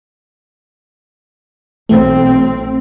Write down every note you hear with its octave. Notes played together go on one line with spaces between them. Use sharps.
B1 E3 A3 C4